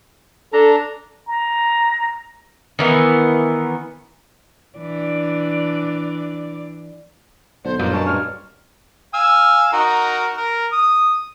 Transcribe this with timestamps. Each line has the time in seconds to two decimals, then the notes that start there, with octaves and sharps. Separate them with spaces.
0.53 D4 A4 A#5
1.27 A#5
2.79 D#3 E3 B3
4.78 E3 D4 D5
7.65 B1 D3 C5
7.79 G1 F#2 A#2 A#3 C5 D#5
7.93 G2 G#3 A#3 C#4 A5
8.06 G2 A#2 F4 C#5 F6
9.14 F5 G#5 E6
9.73 D#4 F#4 A#4
10.37 A#4
10.72 D#6